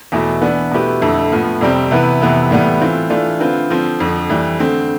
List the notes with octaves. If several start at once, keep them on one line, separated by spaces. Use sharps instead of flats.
E2 B2 A3 E4
E3 B3 D4
B2 A3 E4 G4 B4
F2 D3 A3 E4 A4
A2 F3 B3
F2 C3 G3 C4
C3 E3 B3 E4 B4
F2 C3 E3 B3 E4
A2 E3 G3 B3
E3 A3 C4 F4
E3 A3 D4 F4
D3 A3 C4 F4 B4
D3 F3 C4
F2 D3 F3
F2 E3 G3
D3 A3 C4